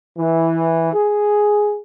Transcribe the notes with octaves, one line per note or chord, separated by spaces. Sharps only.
E3
G#4